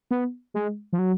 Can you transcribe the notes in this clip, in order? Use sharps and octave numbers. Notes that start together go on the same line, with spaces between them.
B3
G#3
F3
F#3